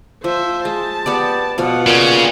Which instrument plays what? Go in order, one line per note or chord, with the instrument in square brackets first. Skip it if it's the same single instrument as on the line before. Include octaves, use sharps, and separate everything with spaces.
[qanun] F3 [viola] C5 E5
[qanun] G#3 [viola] A5
[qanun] B3 G4 D5
[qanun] B2 F3 F5 [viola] B3 F#5
[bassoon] A#2 [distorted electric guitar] C#3